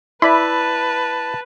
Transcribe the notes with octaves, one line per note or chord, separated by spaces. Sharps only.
E4 B4 D5 E5 A5 B5